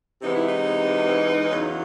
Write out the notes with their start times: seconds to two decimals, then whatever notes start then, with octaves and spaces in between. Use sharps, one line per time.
0.22 C3 E3 G#3 B3 D#4
0.35 E4
0.48 D#4
1.47 E2 C#3 F#3